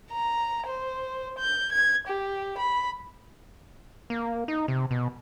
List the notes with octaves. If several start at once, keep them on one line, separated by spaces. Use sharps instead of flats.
A#5
C5
G6
G#6
G4
B5
A#3
D#4
C3
B2